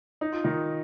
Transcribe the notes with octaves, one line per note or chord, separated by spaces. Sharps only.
D#4
F4
D#3 D#4